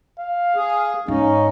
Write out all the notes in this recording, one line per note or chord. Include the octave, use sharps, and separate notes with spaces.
F5
G#4
G#2 C#4 D#4 F5